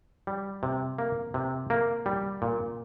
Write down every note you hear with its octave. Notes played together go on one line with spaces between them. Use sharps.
G3
C3
A#3
C3
A#3
G3
A#2